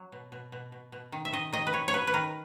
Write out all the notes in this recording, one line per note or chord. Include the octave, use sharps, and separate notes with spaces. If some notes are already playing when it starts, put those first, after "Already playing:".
Already playing: F#3
B2
B2
B2
B2
B2
D#3
E5
D#3 D#5
D#3 D#5
B4
D#3 C#5
C#5
F#3 B4
B4
D#3 A#4